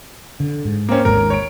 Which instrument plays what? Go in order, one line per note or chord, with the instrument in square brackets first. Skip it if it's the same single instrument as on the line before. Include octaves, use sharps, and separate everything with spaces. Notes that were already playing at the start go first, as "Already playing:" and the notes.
[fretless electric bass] D3
G#2
[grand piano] A#3 C4 C#4
[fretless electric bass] G#1 D#2 G#2 [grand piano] A#4
[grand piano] C#5 D7